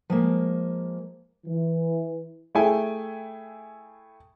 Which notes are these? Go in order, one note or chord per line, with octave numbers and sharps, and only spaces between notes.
F3 G#3 A#3
E3
A3 E4 G#4 E5 G5 G#5